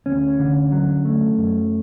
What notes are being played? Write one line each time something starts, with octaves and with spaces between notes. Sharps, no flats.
D2 C#4
D3
F#3
A3
F#2